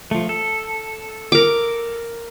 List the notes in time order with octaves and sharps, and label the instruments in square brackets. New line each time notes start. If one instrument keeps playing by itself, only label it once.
[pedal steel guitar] F3 A3
A4
[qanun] A#4 D6